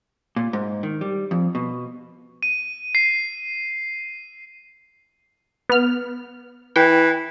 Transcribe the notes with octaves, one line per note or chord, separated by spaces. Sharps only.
A#2
G#2
D#3
G3
F2
B2
D#7
C7
B3 F6
E3 G5